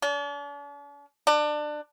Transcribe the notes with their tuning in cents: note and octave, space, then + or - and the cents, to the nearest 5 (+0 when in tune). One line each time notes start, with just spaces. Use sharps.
D4 -45
D4 +25